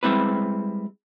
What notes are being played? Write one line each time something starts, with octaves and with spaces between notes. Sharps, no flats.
G3 G#3 C4 E4 B4